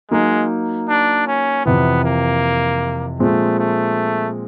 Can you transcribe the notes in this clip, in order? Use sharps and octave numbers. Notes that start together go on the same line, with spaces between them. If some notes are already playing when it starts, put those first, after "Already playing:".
F#3 G#3 A#3 D#4
D4
C#4
F2 C3 E3 B3
A#3
A#2 F3 G#3 A3 C4
A3